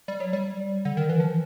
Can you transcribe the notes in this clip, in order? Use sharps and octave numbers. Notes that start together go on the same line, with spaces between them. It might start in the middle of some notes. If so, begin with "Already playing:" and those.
G3
F#3
G3
D3
D#3
E3
F3